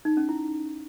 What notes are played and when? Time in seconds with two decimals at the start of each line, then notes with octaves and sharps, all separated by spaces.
0.05 D#4
0.17 C#4
0.29 E4